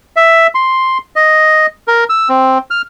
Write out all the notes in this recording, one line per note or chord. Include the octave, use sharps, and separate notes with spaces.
E5
C6
D#5
A#4
E6
C4
F6